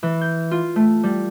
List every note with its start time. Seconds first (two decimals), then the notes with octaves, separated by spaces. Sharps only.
0.03 E3
0.21 G6
0.51 F4
0.76 A3
1.03 G3